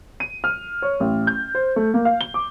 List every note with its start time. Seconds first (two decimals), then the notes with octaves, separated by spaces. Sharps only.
0.20 D#7
0.44 F6
0.82 C#5
1.00 A1
1.27 G6
1.55 C5
1.76 A3
1.94 A#3
2.05 F5
2.21 G7
2.34 D6